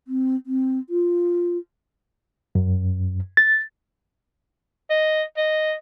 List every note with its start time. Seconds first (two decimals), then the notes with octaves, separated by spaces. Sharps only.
0.08 C4
0.46 C4
0.89 F4
2.55 F#2
3.37 A6
4.90 D#5
5.37 D#5